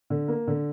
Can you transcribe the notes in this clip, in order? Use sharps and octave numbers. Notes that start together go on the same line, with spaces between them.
D3
A#3
D3